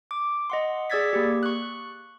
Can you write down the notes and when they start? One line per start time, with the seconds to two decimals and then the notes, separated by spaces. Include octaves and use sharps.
0.11 D6
0.50 D#5 F#5 C6
0.90 G#4 D5 E6 G#6 A6 B6
1.13 A#3 G4
1.43 C#6 F#6